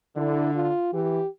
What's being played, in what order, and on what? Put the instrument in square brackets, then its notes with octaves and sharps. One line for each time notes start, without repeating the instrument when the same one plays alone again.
[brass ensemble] D3 [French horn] E4
[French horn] F4
[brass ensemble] E3 [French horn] G4